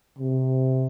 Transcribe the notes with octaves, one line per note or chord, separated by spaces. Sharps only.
C3